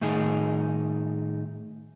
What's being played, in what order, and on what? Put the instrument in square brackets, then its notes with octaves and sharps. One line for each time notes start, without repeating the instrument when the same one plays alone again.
[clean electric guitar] A2 D#3 D#4 G#4